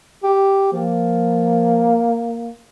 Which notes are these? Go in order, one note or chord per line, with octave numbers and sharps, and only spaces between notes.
G4
F3 A#3